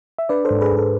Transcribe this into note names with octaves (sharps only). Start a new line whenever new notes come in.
E5
D4 B4 D5
A4 C5
G#2
G#4 B4
G#2 A4